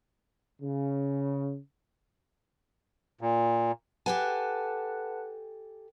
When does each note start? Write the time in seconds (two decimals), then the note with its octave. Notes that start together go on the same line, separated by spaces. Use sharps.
0.61 C#3
3.21 A#2
4.06 G4 A4 B4 F#5 G#5 A5